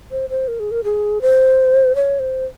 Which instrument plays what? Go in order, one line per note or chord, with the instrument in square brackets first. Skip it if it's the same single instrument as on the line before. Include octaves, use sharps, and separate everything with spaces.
[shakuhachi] C5
C5
A#4
G#4
A#4
G#4
C5
C#5
C5